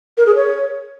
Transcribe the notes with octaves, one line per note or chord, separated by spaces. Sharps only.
A#4
G#4
C#5